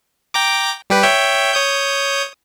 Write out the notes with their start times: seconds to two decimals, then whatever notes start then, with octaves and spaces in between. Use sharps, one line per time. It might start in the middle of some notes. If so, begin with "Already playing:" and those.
0.34 G5 A#5 D6
0.90 G3 G4 B4
1.03 C#5 E5 G5
1.53 C#5 D#6 G6